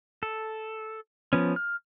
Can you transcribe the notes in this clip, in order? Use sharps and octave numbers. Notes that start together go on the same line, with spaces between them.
A4
F3 B3 C#4
F6